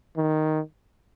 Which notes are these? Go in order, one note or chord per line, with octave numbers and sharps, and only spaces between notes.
D#3